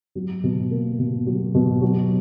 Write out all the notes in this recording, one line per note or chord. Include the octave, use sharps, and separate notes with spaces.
F#3
B2
A#3
B2
F#3
B2
F#3